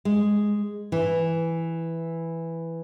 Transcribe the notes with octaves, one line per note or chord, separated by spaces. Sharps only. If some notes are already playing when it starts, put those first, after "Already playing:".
G#3
E3